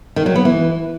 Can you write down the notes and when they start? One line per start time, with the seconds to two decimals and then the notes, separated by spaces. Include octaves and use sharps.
0.16 D#3
0.26 F#3
0.36 B3
0.45 E3